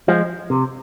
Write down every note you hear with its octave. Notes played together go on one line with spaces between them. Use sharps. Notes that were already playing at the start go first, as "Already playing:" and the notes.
F3 G#3
C3